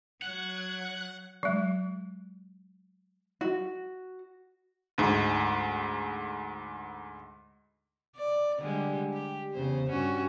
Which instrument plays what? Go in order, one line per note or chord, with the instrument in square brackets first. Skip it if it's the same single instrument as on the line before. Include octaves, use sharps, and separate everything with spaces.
[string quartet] F#3 G#6 [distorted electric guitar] F#5 [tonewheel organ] F#6
[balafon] F#3 G#3
[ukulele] F#4
[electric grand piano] D2 G#2
[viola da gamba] D5
D3 G3 G#3
G4
E2 C#3 C5
G2 C#4 F#4